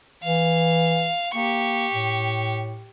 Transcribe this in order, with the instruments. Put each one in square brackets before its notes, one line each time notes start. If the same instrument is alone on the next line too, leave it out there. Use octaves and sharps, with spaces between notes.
[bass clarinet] E3 [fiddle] F5
[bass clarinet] A#3 [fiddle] G4 C#6
[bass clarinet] A2